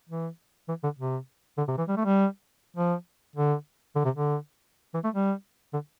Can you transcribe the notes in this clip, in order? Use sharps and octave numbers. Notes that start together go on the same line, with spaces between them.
E3
E3
D3
C3
D3
C3
E3
G3
A3
G3
F3
D3
D3
C3
D3
E3
A3
G3
D3